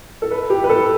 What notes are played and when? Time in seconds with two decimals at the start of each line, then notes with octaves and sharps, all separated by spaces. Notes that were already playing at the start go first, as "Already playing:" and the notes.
0.22 A4
0.31 B4
0.50 G4
0.64 B4
0.69 A4